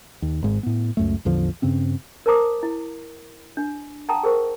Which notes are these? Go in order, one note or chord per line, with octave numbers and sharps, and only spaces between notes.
D#2
G#1 G#2
A2 B3
C#2 F#2 A3
A1 E2 D3 F3
G2 C#3 C4 C#4
A#4 C5 A5 A#5 D6 D#6
E4
D4
F#5 G5 A5 A#5 D#6
G#4 A#4 C5 C#6